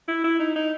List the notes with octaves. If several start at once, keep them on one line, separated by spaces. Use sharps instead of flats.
E4
E4
D#4
D#4